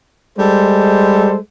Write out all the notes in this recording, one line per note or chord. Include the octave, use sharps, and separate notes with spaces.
G3 G#3 A4 C5